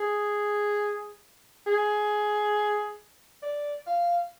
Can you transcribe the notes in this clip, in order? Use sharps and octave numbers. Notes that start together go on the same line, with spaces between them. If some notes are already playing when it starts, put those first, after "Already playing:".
Already playing: G#4
G#4
D5
F5